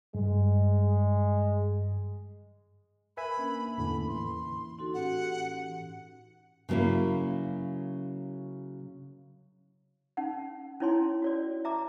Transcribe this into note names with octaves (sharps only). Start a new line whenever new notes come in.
G2 G#3
A#4 B4 E5 G#5 B5
A#3 C#4 D4
E2 A2 D3 B5
E3 C6
D#4 F#4 A4
A2 C#4 G4 F#5
C#3 F#3 A#3 C#4 E4
C#4 D#4 F#5
C#4 D#4 E4 C#5 G#5 C6
F#4 C#5 D5
E5 A#5 D6